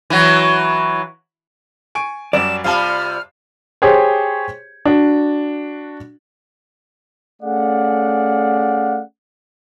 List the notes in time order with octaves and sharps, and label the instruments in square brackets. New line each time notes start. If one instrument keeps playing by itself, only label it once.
[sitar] E3 F#3
[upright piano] G#5 C#6 D7
[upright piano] F#2 G3 F#4 [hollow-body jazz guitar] D5 [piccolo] E7
[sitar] C3 G3 F4 [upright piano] F5 A5 [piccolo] F6
[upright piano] G4 G#4 C5 C#5
D4 F#4
[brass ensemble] A3 C#4 G#4 D5 F5 F#5